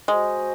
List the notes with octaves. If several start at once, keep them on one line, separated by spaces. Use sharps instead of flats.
G#3 F#4 C5 D#5 G#5